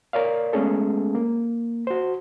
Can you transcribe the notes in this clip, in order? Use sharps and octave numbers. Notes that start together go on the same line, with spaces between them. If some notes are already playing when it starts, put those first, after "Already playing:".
A#4 C#5 D5 F5
G#3 A3 B3 C#4 G#4 A4
A#3
F#4 C5